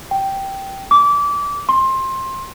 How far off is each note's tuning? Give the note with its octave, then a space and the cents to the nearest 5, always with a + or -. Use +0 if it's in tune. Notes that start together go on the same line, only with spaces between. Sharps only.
G5 -10
D6 -25
C6 +20